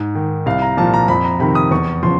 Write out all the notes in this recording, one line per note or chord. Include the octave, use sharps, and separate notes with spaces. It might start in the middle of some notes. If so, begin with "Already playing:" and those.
Already playing: G#2
D#3
C2 F5
A#5
A#2 F3 A5
A#5
F2 B5
A#5
C3 D#3 B5
D#6
E2 C#6
C#3 F3 C6